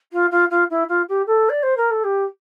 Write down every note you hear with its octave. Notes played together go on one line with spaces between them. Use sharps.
F4
F4
F4
E4
F4
G4
A4
D5
C5
A#4
A4
G4